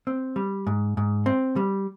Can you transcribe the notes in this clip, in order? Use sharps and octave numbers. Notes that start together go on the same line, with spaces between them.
C4
G3
G#2
G#2
C4
G3